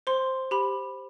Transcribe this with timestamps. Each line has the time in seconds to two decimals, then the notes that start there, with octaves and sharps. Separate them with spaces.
0.07 C5 C6
0.51 G4 B5